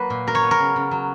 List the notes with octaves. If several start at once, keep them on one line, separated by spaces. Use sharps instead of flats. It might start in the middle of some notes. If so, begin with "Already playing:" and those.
Already playing: F#3 A#3 B4
A#2
F#3 A#4
C#5
B3
A#4
C#3
C#3
F#3